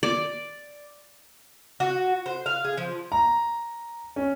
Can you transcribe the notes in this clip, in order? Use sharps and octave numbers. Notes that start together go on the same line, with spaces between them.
D5
F#4
C5
F5
G#4
F3
A#5
C#4